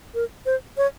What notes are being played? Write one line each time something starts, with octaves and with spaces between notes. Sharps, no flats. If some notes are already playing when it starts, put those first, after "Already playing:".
A#4
C5
C#5